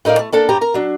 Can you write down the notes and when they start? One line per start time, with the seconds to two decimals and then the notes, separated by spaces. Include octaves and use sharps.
0.05 A2 D#4 A#4 D5 F5
0.19 A3
0.32 A#3 D4 A4
0.49 G2 G4 A#5
0.61 A#4 A#5
0.74 F#3 D4